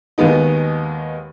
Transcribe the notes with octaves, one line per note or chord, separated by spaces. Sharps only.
D#2 D#3 G#3 B3 D#4